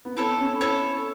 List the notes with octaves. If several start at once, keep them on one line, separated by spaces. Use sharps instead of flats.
B3
C4 E4 A4 C#5
C#4
E4 A4 C#5